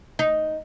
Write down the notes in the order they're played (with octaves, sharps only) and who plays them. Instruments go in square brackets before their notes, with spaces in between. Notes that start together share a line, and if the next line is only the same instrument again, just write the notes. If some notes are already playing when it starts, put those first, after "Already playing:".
[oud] D#4